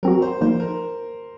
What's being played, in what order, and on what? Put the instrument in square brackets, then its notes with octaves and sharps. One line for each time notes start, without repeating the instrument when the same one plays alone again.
[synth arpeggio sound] F#3 C4 F#4 [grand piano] A#4
[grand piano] C5
[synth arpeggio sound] F3 A#3 D#4 [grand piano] C5
[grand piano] A#4